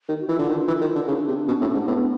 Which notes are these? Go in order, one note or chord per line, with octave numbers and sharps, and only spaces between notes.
D#3
F#4
E3 F4
D3
D#3
E3
D#3
D3
C#3 D#4
D4
C3
D4
B2 C#4
A2 C4
C#4
G#2
D4
A2 B3